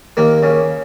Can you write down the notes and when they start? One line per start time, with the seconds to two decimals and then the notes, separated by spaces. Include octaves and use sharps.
0.17 D#2 A#3
0.43 C#3